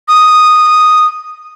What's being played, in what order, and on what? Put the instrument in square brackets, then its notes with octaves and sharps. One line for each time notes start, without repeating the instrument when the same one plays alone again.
[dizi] D#6